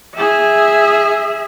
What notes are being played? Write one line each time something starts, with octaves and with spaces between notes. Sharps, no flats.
G#4 E5